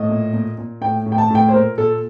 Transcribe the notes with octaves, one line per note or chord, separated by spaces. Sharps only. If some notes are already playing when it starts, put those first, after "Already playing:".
Already playing: A2 D#5
A#2
A#2
A#2
A2 G5
A2
G5
A5
A2 G5
C5
A#2 A#4
A#2 A4